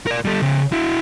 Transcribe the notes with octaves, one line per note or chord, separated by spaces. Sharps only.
A#4 D5
G3 A4
C#3 C5
E4 F#4